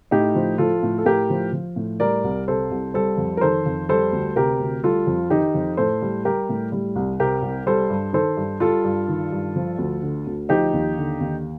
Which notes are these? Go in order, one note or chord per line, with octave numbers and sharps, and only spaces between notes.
A2 D#4 G4
F3
F3 F4 A4
A2
A4
A2 G4 A#4
F3
F3
A2
G3 A#4 D5
C2
C3 A4 C5
C2
G3 A4 C5
F2
A#4
D#3 A4 C5
F2
G3 A4 C5
D2
C3 G4 A#4
D2
G3 F4 A4
F2
D#3 D#4 G4
F2
A2 A4 C5
G3
G3 G4 A#4
A2
G3
C2
C3 G4 A#4
C2
G3 A4 C5
G2
D#3 A4 C5
G2
G3 F4 A4
G2
D#3
G2
F3
D2
D3
D2
F3 D#4 G4
D#2
D3
D#2